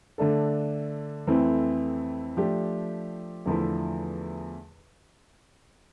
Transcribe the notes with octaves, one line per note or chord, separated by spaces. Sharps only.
D3 A3 D4 A4
F2 E3 A3 C4 E4
F3 A3 D4 G4
E2 D3 F3 A3 E4